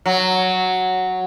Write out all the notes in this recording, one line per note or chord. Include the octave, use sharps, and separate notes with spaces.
F#3